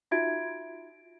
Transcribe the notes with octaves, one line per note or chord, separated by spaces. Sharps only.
D#4 F4 F#4 E5 G#6 D7